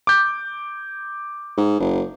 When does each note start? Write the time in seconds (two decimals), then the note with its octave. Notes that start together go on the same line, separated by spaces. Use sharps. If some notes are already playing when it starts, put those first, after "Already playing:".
0.07 D6 G6
1.57 G#2
1.80 F#1